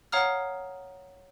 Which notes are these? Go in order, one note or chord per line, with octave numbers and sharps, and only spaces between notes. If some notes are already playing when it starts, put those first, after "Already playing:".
C#5 F5 F#5 A#5 D#6 F6